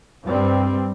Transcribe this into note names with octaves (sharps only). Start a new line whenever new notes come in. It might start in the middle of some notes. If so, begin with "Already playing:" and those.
G2 G3 C4